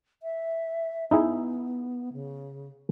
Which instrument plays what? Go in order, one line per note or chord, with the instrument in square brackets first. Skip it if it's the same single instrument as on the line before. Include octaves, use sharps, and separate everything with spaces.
[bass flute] E5
[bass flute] B3 [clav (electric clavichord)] D#4 E4 G#4
[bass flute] C#3